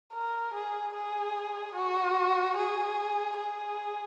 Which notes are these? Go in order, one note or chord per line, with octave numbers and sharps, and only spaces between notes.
A#4
G#4
G#4
F#4
G#4
G#4